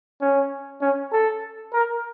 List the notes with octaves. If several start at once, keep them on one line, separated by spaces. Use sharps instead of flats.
C#4
C#4
A4
A#4